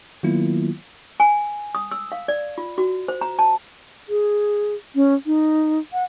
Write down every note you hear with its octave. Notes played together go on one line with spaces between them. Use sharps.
D#3 F#3 A#3 B3 E4 F4
G#5
D#6
E6
F5
D5
F4
F#4
C5
A#5
A5
G#4
C#4
D#4
F#5